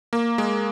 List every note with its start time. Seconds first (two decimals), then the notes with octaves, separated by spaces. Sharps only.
0.13 A#3
0.38 G#3